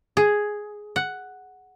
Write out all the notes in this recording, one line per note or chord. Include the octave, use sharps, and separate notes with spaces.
G#4
F#5